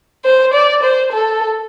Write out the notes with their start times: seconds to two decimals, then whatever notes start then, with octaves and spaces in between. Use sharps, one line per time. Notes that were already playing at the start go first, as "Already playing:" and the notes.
0.24 C5
0.53 D5
0.83 C5
1.12 A4